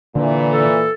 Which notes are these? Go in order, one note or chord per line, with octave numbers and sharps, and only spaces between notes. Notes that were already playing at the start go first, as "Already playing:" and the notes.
A#2 D3 E3
A4